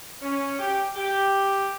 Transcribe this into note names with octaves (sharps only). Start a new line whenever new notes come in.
C#4
G4
G4